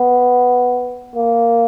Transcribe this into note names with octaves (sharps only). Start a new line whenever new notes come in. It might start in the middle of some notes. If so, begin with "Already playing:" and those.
Already playing: B3
A#3